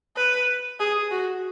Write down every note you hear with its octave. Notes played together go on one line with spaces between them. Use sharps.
B4
G#4
F#4